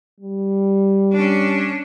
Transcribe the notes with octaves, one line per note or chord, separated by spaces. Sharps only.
G3
C#4 D4